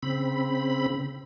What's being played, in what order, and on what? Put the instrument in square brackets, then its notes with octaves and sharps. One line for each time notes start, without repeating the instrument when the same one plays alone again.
[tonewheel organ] C#3 C4 B5